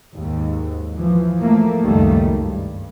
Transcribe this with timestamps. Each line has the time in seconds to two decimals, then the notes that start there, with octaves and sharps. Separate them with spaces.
0.14 D#2 G#2
0.96 E3 F3
1.39 F3 A3 A#3
1.83 C#2 F#2 D#3 G3 A3 A#3
2.28 G2